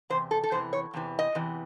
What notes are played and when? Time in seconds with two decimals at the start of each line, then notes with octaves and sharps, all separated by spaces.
0.10 E2 C3 C5
0.31 A4
0.43 A4
0.51 E2 C3 E3 C5
0.73 C#5
0.94 E2 C3 E3
1.19 D#5
1.35 E2 C3 E3